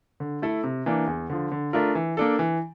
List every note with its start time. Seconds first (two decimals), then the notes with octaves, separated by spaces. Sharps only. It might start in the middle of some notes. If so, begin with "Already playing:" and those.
0.20 D3
0.42 A3 E4 A4
0.63 C3
0.86 E3 A#3 D4
1.07 E2
1.30 D3 F3
1.52 D3
1.73 A3 D4 F4 A#4
1.95 E3
2.17 A#3 D4 A4
2.39 E3